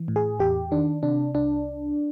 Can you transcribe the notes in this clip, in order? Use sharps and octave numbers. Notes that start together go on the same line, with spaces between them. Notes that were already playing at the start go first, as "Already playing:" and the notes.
Already playing: E3
A2
G#4
E2 G4
D#3 D4
C3 D4
C2 D4